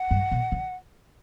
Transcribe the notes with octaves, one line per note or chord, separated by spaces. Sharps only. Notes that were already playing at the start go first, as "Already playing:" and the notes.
Already playing: F#5
G2
B2
C#3